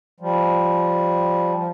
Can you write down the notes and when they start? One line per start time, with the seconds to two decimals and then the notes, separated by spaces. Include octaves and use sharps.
0.20 F3 G3
1.56 F3